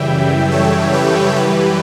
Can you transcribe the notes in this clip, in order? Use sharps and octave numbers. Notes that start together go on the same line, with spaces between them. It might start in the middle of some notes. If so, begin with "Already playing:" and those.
Already playing: F#2 C#3 E3 G3 E5 G5
A4 C#5
G4 B4
F#2 E3 G3 G4 B4